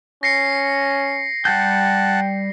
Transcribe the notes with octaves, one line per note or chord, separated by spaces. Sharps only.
C#4 A#6 C7 C#7
G3 F#5 G5 A5 G6